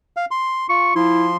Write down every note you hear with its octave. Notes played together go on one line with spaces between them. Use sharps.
F5
C6
F4 C#6
F3 E4 C6